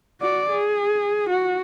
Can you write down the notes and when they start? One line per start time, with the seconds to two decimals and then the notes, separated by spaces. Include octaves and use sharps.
0.20 F#4 D5
0.50 G#4
1.30 F#4